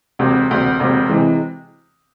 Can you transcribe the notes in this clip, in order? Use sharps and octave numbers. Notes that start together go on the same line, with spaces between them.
E1 D2 C3
E1 D2 C3
E1 D2 C3
C3 E3 G#3